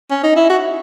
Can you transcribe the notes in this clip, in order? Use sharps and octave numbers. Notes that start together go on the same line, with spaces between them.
C#4
D#4
E4
F#4